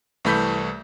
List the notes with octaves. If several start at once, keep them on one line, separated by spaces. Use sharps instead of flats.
C2 E3 A3 B5 G6 B6